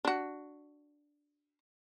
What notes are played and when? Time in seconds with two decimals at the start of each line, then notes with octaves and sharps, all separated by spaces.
0.05 D4 F#4